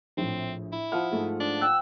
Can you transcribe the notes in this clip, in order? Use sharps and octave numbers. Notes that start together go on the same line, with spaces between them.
A#1 A2 F3 C4
E4
F3 F#5 D#6 F6
G#2 A3 G#4
D4
G5 E6 F#6